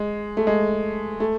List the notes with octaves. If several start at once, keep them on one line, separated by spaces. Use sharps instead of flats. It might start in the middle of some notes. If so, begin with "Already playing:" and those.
Already playing: G#3
A3
G#3
A3